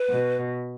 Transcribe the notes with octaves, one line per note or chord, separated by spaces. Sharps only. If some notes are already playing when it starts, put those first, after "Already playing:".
Already playing: B4
B2